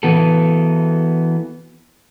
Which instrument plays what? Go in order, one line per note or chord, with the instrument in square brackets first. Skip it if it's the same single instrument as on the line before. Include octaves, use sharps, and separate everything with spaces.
[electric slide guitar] E3 B3 F#4 A4